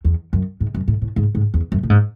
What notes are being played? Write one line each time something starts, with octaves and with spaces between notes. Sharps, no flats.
E2
F#2
G#2
F#2
A2
A2
G#2
G#2
E2
F#2
A2
G#2